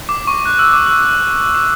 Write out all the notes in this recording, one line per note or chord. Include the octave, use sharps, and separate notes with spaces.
D6
C#6
F#6
E6
D6
E6
D6